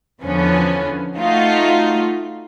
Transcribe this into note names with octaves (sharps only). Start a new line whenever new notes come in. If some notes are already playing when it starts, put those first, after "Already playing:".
E2 D3 F3 B3 C#4
A3 D#4 F4 F#4